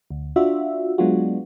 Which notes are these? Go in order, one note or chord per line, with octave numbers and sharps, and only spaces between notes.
D2
D4 F4 F#4 E5
F#3 G#3 B3 D4 F4 F#4